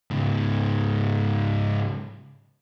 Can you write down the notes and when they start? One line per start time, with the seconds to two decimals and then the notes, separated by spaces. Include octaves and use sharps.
0.11 G#2 C#3